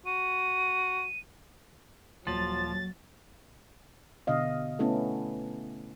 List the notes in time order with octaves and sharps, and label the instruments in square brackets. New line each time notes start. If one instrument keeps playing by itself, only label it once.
[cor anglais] F#4 [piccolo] D#7
[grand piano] D#1 F#7 [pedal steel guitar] F3 [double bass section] F#3 [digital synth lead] A6
[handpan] B2 D3 D#5 F5
A3 B3 C#4 E4 A4